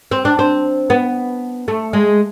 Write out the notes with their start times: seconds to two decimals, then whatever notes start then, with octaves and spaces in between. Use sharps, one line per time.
0.11 C4
0.25 D4
0.39 C4
0.90 B3
1.68 A3
1.93 G#3